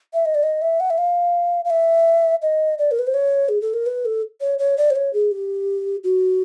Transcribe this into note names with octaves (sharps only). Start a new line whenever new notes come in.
E5
D#5
D5
D#5
E5
F#5
E5
F5
F5
E5
D#5
D5
A#4
B4
C5
C#5
G#4
A4
A#4
B4
A4
C#5
C#5
D5
C5
C#5
G#4
G4
F#4